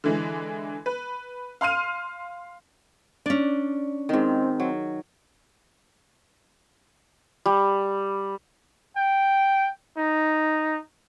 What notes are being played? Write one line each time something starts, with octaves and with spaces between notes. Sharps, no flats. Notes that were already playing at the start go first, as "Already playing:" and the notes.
D3 E3 G#3
B4
F5 C6 F6 D#7
C#4 D4 D5
G#2 D#3 C4
F#3
G3
G5
D#4